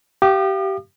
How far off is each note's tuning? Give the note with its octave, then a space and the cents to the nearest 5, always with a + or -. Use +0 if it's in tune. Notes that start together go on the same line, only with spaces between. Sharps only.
G4 -20 F5 -30 D6 +45